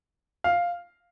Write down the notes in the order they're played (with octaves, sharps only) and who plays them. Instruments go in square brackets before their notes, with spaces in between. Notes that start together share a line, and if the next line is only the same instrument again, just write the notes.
[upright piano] F5